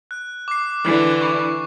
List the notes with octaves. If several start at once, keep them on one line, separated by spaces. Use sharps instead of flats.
F#6
D6 C7
D3 E3
C#6